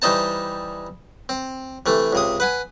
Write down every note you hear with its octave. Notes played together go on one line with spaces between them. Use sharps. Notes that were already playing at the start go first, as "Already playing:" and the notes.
E3 G3 D#4 C5 A5
C4
C3 E3 A3
C#2 C3 D#6
B4 F#5 G#5